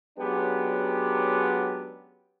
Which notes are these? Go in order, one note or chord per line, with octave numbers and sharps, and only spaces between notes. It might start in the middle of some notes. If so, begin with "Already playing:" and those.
F#3 G#3 B3 C#4 D4 G4